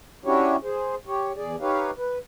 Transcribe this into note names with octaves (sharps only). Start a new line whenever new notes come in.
C#4 D4 E4 F#4 G4 C#5
G#4 C5
G4 C#5
E2 G#4 D5
D#4 G4 B4 C#5 F5
B4